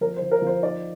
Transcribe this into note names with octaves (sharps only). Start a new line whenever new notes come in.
F3 A#4
C5
F3
A#4
F3 C5
D#4 D5